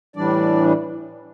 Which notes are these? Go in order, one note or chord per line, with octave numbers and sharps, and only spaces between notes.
A2 E3 G3 D4 D5